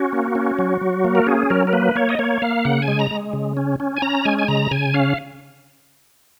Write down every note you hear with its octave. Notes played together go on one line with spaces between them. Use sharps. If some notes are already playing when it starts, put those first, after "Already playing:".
Already playing: C#4 F#4
A#3
C#4
F#3
F#3
A#3
A#4
C#4 G#4
F#3 A#4
A#4
A#3 B4
A#3 C#5
D#5
A#3 C#5
A#3 F5
C#3 F#5
G#5
G#3
A#5
G#3
C#3
C#4
C#4
G#5
C#4 A#5
G#3 G#5
G#5
C#3 A#5
C#3 G#5
C#4 F5